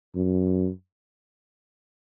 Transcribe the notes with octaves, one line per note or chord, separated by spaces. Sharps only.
F#2